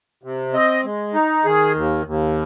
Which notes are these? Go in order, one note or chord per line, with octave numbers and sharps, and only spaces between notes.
C3
C4 D#5
G#3
D#4
D#3 G#4
D#2
D#2